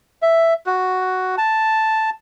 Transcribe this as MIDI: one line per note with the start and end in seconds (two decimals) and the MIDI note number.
0.22 0.54 76
0.66 1.36 66
1.38 2.10 81